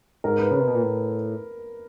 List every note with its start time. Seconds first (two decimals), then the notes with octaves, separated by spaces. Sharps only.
0.24 G#2 A#4
0.39 B4
0.51 C#3 B4
0.60 C3
0.67 B2
0.75 A#2
0.83 A2